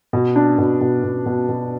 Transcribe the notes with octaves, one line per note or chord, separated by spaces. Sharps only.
B2
D4
B2
B2
B2
B2
B2